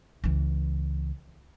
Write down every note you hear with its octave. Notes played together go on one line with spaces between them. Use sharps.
C#2 E3